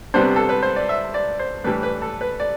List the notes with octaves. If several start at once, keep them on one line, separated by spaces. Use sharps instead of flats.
C2 C3 G3 B3 D4 C5
A4
B4
C5
D5
E5
D5
C5
A2 E3 G3 D4 B4
B4
A4
B4
D5